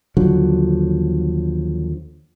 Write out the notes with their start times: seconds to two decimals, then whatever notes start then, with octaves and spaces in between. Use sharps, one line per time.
0.17 D#2 D3 F3 F#3